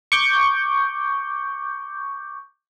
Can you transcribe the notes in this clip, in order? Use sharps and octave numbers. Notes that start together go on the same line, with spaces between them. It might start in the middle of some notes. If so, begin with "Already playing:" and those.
C#6 D6 G6